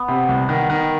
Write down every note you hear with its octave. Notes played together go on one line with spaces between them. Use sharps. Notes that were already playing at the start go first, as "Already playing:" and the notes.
Already playing: B3
C3
C2
D#3
D#3